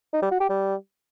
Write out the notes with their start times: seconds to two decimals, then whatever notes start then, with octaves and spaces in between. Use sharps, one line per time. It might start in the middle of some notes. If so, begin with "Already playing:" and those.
0.13 D#4
0.22 G3
0.31 F#4
0.40 G4
0.49 G3